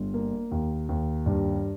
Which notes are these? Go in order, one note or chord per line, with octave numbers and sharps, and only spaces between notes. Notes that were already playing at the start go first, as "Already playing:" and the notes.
Already playing: G1
A#3
D#2
D#2
G2